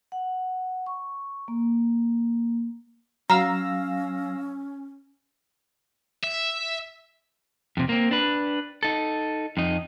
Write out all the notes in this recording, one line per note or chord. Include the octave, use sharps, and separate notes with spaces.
F#5
C#6
A#3
F#3 C#4 F5 A#5 E6 A#6
E5
F2 C3
A#3 C4
D4 B4
D#4 A4
F2 D#4